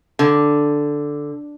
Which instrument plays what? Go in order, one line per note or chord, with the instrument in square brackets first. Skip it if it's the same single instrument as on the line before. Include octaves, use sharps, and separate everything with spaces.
[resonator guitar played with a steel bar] D3